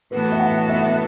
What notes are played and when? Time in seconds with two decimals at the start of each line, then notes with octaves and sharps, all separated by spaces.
0.11 A2 E3 B3 F#4 A4 B4
0.32 E5
0.40 F#5
0.69 E5